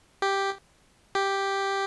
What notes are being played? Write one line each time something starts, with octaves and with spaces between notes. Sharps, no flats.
G4
G4